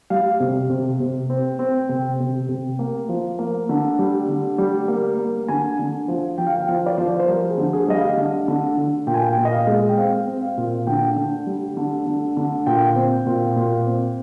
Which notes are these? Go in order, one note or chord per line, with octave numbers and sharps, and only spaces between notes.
G3 F5
C3
C3
C3
C4
C4
C3 G5
C3
C3
A#3
F3
A#3
D3
G3
D3
G3
A#3
A#3
D3 G#5
D3
F3
F3 G5
F5
G5
F3 F5
D5
F3 C5
C5
G3 A#4
G#4
D3
G#4
G3 D#5
F5
D3
D3
D3
A#2 G5
G#5
G5
A#2
D#5
F5
G#3
G5
C4 F5
C4
F5
A#2
D3 G5
D3
G3
D3
D3
D3
A#2 G5
C4
A#2
A#2
C4